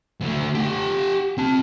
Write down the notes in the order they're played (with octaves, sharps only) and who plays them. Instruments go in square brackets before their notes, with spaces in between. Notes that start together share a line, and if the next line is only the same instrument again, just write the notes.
[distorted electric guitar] D2 A3
G4 F#5
C4 A5